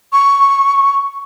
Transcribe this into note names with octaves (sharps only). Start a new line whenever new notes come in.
C#6